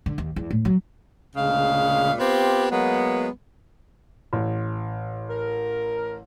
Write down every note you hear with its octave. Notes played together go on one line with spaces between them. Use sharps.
D3
D#2
E2
A2
F#3
D2 A#2 C#3 G#3 F5
B3 C4 F4 G4
F#3 G#3 A#3 B3
A1
A#4